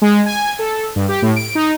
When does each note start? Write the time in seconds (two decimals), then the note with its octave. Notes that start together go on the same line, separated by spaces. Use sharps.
0.02 G#3
0.26 G#5
0.59 A4
0.96 G2
1.09 G4
1.22 A2
1.36 D7
1.55 D#4